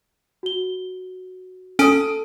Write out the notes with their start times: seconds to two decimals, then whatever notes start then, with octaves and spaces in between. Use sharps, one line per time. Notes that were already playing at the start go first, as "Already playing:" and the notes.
0.43 F#4 G7
1.79 C#4 A4 D#6 D7